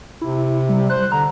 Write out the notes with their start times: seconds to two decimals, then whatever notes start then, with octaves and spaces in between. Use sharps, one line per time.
0.21 C3 E4
0.69 G3
0.90 C5 F#6
1.12 D3 A#5